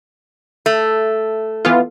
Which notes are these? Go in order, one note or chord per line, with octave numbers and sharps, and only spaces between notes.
A3
E3 B3 F4